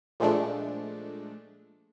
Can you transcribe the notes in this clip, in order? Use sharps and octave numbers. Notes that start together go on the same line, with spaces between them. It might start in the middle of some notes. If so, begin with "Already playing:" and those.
A#2 F3 G#3 A3 D4